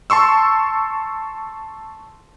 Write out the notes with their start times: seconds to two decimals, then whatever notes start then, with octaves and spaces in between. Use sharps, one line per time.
0.10 A5 C6 C#6 E6